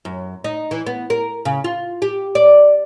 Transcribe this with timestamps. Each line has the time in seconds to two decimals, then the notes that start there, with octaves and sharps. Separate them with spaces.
0.05 F#2
0.44 D#4
0.71 E3
0.86 B3
1.10 A#4
1.45 C#3
1.64 F4
2.02 G4
2.35 D5